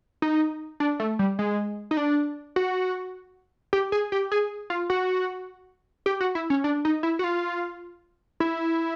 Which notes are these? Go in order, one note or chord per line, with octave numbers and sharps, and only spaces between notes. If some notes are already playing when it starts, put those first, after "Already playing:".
D#4
D4
A3
G3
G#3
D#4
D4
F#4
G4
G#4
G4
G#4
F4
F#4
G4
F#4
E4
C#4
D4
D#4
E4
F#4
F4
E4